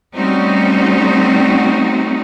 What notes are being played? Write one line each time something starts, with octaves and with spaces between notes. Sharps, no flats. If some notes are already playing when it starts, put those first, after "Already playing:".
G3 A3 C4 C#4 D#4 F#4